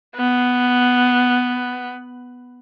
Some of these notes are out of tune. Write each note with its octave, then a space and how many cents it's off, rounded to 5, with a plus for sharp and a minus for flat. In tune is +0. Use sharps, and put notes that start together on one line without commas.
B3 +5